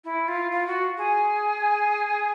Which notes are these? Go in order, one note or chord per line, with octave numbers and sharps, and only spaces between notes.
E4
F4
F4
F#4
G#4